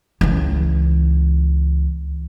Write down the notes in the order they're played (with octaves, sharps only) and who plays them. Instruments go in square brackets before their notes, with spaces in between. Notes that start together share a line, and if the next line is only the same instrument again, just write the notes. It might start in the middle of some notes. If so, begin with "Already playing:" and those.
[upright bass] C#2 E3